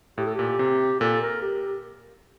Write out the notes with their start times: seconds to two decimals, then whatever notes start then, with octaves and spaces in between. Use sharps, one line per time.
0.18 A2 G4
0.26 A4
0.35 A#2 G4
0.59 C3
1.00 A#2 A4
1.22 A#4
1.42 G4